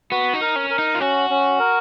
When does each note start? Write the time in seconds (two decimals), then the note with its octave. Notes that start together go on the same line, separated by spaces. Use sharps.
0.11 B3 F#4
0.34 D#4
0.41 A#4
0.56 C#4
0.70 A#4
0.79 D#4
0.95 F4
1.00 C#4 F#4
1.30 C#4
1.59 A#4